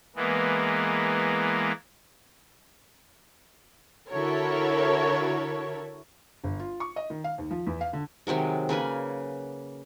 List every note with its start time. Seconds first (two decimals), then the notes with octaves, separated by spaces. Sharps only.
0.16 E3 G#3 A#3 B3
4.09 D3 E4 F#4 A4 A#4 C#5
6.44 G1
6.60 F4
6.80 C#6
6.96 D#5
7.10 D#3
7.24 F5
7.38 D#2
7.51 F3
7.67 E2
7.81 F5
7.93 D3
8.27 C3 D#3 F#3 G#3
8.69 C#3 A#3 B4 G#5